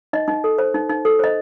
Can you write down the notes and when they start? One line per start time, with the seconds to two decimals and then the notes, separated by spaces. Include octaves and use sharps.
0.13 D#4 D#5
0.28 D#4
0.44 A4
0.58 C5
0.74 D#4
0.89 D#4
1.05 A4
1.19 C5 D#5